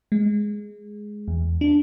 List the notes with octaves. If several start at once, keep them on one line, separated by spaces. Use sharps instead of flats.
G#3
E2
D4